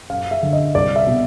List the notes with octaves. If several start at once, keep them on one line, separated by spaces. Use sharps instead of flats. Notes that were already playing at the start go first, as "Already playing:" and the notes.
F#2 F5
E5
D3
D#5
C2 D5
E5
B2